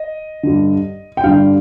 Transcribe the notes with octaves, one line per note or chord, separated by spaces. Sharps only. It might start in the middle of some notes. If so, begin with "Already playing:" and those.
Already playing: D#5
G2 D3
G5
G2 D3 F5